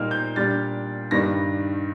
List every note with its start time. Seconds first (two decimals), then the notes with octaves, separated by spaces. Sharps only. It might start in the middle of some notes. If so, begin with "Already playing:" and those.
Already playing: A#2 G3 A#3 D#4 F6
0.11 G6
0.36 A#2 G3 D4 A6
1.11 G2 D#3 G3 D4 A#6